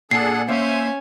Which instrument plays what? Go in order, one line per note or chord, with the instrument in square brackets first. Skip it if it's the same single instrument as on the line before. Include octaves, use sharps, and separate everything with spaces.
[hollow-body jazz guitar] A#2 [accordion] D4 G#4 A4 [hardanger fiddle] F#5 [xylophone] C7
[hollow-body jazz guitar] A#3 F5 [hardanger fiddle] C#4 G#5 [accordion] C5 E5